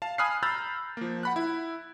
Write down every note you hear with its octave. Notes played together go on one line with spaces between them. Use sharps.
F5 A5
G#5 B5 D#6 F6 F#6 C7
A#5 B5 E6 F6 G6 A6
F3 A#3
F#5 B5 F#6
E4